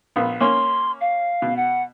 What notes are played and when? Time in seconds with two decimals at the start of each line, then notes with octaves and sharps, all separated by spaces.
0.16 A#1 B3
0.41 A#3 C#4 C6
1.01 F5
1.42 B2
1.56 F#5